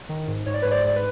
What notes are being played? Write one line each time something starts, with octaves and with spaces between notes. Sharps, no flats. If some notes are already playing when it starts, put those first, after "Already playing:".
D#3
G#2
G#2 C#5
D5
G#2 B4 C#5
C5 D5
G#2 D5
B4